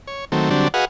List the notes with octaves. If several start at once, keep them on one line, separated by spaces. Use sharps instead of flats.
C#5
D#3 F#3 A3 C4
D3 F#3 G3 C4 D4
F#4 G#4 B4 D#5 F5 F#5